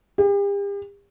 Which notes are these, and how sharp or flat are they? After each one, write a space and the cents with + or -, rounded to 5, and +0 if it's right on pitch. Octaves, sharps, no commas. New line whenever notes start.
G4 +40